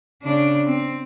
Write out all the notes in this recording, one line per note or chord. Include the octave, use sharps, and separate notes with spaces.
C#3 D4
C4